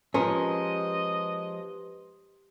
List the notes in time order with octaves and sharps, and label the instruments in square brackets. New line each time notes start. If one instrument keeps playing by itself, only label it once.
[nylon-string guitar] F3 G#3 A#4 [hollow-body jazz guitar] C#4 [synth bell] G4 B4 C6 [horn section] D#5